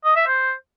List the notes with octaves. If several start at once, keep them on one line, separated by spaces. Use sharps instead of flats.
D#5
E5
C5